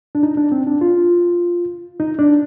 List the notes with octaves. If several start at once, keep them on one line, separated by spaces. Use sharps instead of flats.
D4
D#4
D4
C4
D4
F4
D#4
D4